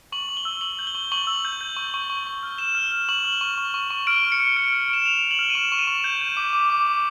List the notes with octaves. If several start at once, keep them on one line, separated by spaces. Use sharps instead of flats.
C#6 F#7
C#6
G7
E6
C#6 F#7
G6
G7
C#6
C#6 F#7
E6
G6
G6
C#6
C#6
C#6
C#6
F6
F6 E7
F6
F6
C#6 F#7
F6
C#6
C#6
C#6
C#6
F6 D7
C#6
C#7
F6
F6 D7
D7
F6
D7
C#6 E7
C#6 F7
C#6
F#7
F6
D#7
C#6 E7
C#6
D#7
C#6
G6
G6
D6
D6
D6
D6